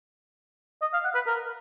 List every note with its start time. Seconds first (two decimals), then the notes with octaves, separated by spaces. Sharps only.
0.82 D#5
0.93 F5
1.04 F#5
1.15 B4
1.27 A#4